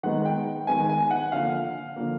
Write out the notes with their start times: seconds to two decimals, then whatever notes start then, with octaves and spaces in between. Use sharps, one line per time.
0.03 D#3 G#3 B3 F#5
0.25 G5
0.67 D#3 G#3 B3 G#5
0.89 G#5
1.11 F#5
1.32 D3 F3 A#3 F5
1.96 D3 F3 A#3